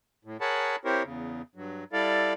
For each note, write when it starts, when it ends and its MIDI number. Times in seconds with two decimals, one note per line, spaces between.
0.25 0.37 45
0.41 0.76 68
0.41 0.76 70
0.41 0.76 73
0.41 0.76 78
0.41 0.76 81
0.41 0.76 83
0.85 1.03 60
0.85 1.03 64
0.85 1.03 67
0.85 1.03 70
0.85 1.03 72
0.85 1.03 73
1.04 1.42 40
1.04 1.42 49
1.55 1.84 43
1.55 1.84 54
1.93 2.33 55
1.93 2.33 64
1.93 2.33 69
1.93 2.33 74
1.93 2.33 77